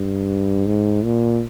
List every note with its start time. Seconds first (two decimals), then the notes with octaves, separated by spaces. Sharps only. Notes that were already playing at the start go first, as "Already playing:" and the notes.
Already playing: G2
0.66 G#2
1.04 A#2